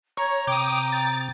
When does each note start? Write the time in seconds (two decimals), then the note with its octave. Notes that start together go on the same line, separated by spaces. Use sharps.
0.17 C#5 A#5
0.47 C3 G5 D6 D#6
0.92 A6